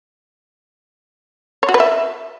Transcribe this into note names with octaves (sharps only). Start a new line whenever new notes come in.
C#5
F#4
B4
E5